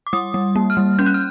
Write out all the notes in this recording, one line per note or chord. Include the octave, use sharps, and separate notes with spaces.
D6
G3 D#6
G3
A#3
F6
G3
C#4 G6
F#6
F6